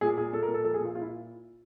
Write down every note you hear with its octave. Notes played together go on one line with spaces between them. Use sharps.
A#2 G#4
A#2 G#4
A#2 A4
A#4
A#2
A4
F3 A4
G#4
A#2 F4
A#2 F4
E4